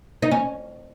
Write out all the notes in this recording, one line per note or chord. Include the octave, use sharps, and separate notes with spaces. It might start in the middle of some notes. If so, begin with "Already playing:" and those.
D#4
C#4